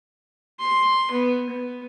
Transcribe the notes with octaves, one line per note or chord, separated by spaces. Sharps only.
C6
B3
B3